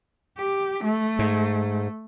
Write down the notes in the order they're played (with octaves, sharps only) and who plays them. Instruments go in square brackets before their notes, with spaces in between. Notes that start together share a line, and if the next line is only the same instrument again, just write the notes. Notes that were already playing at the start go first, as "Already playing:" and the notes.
[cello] G4
A3
[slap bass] G#2